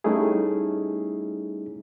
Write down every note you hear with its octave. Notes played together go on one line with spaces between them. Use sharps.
G3 A3 C#4 D#4 E4 G#4